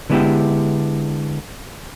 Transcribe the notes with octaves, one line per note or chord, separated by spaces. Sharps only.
D3 G#3 B3 E4 G4